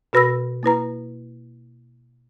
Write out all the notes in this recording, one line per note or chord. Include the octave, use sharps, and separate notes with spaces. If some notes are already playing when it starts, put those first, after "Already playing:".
B2 F#4 B4 B5 E6 A#6
A#3 E4 B4 A#5